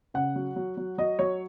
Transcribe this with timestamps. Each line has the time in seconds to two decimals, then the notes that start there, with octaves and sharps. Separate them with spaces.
0.14 C#3 F#5
0.36 F#3
0.56 F#3
0.77 F#3
0.98 F#3 D#5
1.19 F#3 C#5